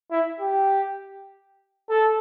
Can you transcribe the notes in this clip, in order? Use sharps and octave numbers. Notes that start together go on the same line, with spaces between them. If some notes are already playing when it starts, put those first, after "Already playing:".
E4
G4
A4